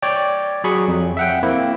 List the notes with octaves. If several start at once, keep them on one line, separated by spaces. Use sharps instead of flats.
C#5 D5 G5
F#3 G#4 B5 C#6
F2
E5 F#5 G5
A#3 C4 E4